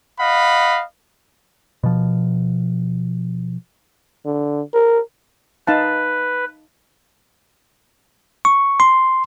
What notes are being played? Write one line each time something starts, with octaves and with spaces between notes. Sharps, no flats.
D#5 F5 F#5 B5
B2 F3
D3
A#4
D#4 B4 F5 A5
C#6
C6